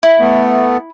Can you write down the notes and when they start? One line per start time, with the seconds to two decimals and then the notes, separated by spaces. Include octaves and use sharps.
0.03 E4
0.20 A3 B3